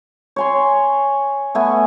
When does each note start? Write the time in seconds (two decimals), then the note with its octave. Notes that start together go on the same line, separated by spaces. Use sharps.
0.36 C#5 G#5 C6
1.55 A3 B3 G#5